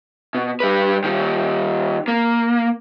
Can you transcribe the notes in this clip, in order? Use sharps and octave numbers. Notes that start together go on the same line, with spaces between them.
B2
G3 B4
D#3 G3
A#3